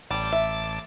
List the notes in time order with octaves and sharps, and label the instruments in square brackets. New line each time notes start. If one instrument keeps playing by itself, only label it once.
[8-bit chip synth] A1 A5 D6 [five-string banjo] G3
[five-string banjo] E5